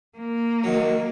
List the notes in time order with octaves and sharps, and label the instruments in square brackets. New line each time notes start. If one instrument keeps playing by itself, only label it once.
[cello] A#3
[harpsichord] D#3 F#3